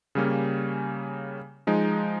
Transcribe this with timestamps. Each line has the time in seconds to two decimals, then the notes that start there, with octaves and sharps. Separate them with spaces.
0.15 C#3 G3 A#3 C#4
1.67 F3 G#3 D#4